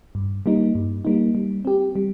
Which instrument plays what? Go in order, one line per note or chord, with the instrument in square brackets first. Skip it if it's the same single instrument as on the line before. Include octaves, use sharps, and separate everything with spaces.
[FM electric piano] G2
G3 A#3 D#4
G2
G3 A#3 D#4
G3
C4 G4
G3